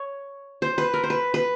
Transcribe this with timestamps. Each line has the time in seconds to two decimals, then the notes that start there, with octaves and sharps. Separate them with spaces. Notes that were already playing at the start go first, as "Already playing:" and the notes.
Already playing: C#5
0.62 C5
0.78 B4
0.94 A#4
1.03 C5
1.10 B4
1.34 B4